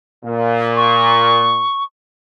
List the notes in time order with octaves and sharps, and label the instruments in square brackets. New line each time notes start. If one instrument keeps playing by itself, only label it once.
[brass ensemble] A#2
[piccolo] C#6